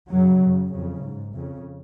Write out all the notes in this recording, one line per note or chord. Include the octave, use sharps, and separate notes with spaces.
F#2 C#3 F#3
F#2 C#3
F2 C#3
G#2
F2 C#3